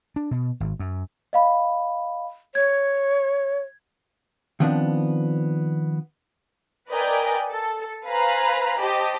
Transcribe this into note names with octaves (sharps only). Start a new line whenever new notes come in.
D4
B2
G#1
F#2
D#5 F5 B5
C#5 G#6
D#3 F3 B3 C4 D4
A#4 B4 D5 D#5 G5 G#5
A4
B4 C5 F5 G#5 A#5 B5
G4 C5 D#5 A5